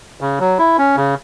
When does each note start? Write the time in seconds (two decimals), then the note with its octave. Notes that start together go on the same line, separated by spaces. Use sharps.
0.21 C#3
0.40 F#3
0.59 E4
0.78 C#4
0.96 C#3